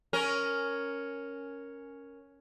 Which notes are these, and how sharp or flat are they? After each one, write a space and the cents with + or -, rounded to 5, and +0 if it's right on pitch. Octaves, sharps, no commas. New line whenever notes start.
C#4 +0 A#4 +0